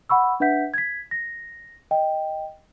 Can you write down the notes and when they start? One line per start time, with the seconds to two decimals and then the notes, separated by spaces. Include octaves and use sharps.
0.09 F#5 B5 C#6 E6
0.40 D4 B4 E5 F#5 G6 B6
0.74 G#6 B6
1.11 A#6
1.91 D#5 G5